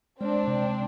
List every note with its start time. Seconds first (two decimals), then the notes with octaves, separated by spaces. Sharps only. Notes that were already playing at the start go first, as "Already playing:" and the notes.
0.21 G#3 C4 D4
0.47 C3